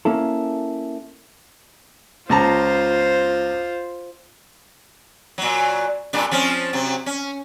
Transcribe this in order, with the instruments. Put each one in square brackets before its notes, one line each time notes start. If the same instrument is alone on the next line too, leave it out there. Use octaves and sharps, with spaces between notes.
[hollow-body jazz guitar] A#3 C#4 E4 A4
[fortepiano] C#2 A5 A#5 [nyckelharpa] F4 C5
[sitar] A#2 F#3
G2 A#2 D4
F3 C4 C#4
C3 F#3
C#4